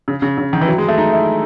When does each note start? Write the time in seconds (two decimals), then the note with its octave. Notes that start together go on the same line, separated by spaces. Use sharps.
0.08 C#3
0.22 C#3
0.38 C#3
0.53 D#3
0.61 E3
0.68 F#3
0.78 G#3
0.88 A3
0.98 D#4
1.13 E4